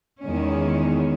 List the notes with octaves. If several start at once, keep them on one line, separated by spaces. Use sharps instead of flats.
E2 D#3 G#3 C#4